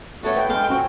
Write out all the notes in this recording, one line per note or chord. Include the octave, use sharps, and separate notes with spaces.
G3 A3 B3 F#4 A4 C#5
B4 C5 G5
G2 G#3 B3 A4 C5 F5
A#2 C4 C#4 F#4 G5